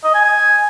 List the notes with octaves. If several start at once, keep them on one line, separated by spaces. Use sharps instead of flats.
D#5
G#5
G#5